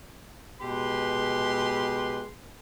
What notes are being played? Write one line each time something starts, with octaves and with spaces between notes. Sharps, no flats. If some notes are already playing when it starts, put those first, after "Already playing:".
B2 G#3 G4 B4 C6